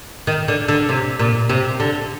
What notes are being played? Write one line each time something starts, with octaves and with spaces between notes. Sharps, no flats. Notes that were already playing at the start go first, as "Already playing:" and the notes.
D#3
D3
D3
C3
A#2
C3
D3